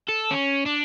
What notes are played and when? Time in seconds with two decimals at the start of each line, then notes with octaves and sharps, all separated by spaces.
0.09 A4
0.31 C#4
0.66 D4